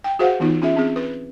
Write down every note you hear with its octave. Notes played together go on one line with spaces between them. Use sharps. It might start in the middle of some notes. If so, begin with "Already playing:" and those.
G5
F#4 G#4 C5 F5 F#5
E3 B3 D#4 F4
C#4 F4 G#4 E5
C4 G#4
B4